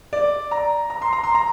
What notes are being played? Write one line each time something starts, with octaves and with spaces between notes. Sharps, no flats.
D5
A#5
A#5
C6
A#5
C6
A#5